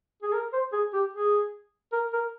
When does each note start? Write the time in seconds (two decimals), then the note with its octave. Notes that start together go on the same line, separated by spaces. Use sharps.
0.23 G#4
0.33 A#4
0.53 C5
0.73 G#4
0.93 G4
1.13 G#4
1.93 A#4
2.13 A#4